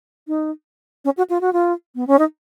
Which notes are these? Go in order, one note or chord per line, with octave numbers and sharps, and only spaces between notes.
D#4
C#4
F#4
F4
F#4
F4
B3
C#4
D#4